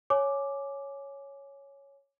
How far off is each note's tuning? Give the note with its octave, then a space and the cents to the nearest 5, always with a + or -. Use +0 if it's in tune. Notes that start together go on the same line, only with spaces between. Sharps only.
C#5 +0 G#5 +20 D6 +0